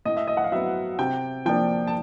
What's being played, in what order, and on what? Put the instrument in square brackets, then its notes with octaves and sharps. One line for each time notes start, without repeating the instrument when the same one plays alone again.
[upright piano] A2 D#5
E5
D#5
F#5
F5
F#3 B3 E5
C3 G5
F3 A#3 D4 G5
A5